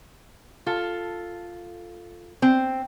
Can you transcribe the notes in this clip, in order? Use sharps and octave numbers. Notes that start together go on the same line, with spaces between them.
F4 A4
C4